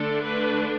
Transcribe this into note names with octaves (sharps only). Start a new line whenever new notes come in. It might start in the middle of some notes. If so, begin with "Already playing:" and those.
Already playing: D3 A3 D4 A4
B4